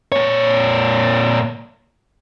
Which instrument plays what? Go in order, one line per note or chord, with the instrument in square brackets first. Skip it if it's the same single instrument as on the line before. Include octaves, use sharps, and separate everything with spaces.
[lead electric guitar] A#2 C#5